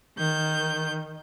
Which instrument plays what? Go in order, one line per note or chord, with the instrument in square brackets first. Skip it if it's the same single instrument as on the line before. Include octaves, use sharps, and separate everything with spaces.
[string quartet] D#3 G6